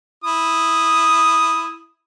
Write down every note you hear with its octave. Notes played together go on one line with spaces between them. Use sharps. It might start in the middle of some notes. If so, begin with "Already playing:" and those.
E4 D#6